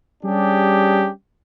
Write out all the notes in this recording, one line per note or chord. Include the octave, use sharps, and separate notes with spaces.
G3 C#4 D4 G4 G#4